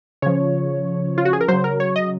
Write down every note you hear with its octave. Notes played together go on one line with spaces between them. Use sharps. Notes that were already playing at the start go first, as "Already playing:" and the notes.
C#3 F3 C#5
F4
F#4
G#4
A#4
C#3 F#3 C5
A#4
C#5
D#5